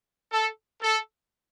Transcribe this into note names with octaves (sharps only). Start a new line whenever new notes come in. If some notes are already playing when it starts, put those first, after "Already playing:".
A4
A4